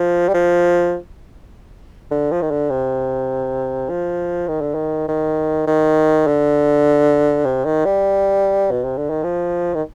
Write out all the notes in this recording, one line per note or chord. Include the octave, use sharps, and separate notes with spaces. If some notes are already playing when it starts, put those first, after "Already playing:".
Already playing: F3
G3
F3
D3
F3
D#3
D3
C3
F3
D#3
D3
D#3
D#3
D#3
D3
C3
D#3
G3
B2
C3
D3
D#3
F3
D#3